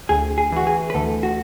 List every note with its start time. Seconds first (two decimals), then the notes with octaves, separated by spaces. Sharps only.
0.09 D2 G#4
0.38 G#4
0.52 E3 F#4
0.67 G#4
0.90 B4
0.94 D2 A4
1.23 F#4